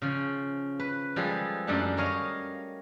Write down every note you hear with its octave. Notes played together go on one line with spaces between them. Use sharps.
C#3 F3
B4
F3 G3 G#3 G#4 A4
F#2 G3 A3 D4 G4 F#5
A#4 C#5 D#5 F5